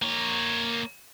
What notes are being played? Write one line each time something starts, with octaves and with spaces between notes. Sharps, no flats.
A#3 C#5